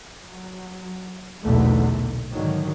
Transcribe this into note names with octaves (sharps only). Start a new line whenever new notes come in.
F#3
B1 E2 A#2 D3 A3
G#2 D3 D#3 F#3